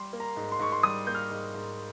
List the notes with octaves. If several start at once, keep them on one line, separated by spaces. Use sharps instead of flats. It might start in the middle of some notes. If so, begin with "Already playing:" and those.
Already playing: G3 C6
A#3
A#5
G#2
C6
G#2 C#6
C6
G3 D#6
A#3 G6
F6
G#2
G#2